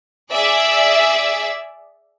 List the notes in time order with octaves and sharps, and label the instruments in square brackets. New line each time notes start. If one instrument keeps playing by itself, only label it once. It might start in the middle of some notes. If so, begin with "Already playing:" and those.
[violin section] G#4 D5 E5